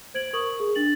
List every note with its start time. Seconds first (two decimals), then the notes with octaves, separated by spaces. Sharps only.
0.14 C5 G#6 D7 F#7
0.33 A#4 C#6 D#6 F#7
0.60 G#4
0.75 D4 A6 F#7